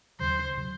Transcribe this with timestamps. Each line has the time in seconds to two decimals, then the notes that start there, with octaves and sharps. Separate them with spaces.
0.19 D#2 C#3 F#3 C5
0.57 C#3 F#3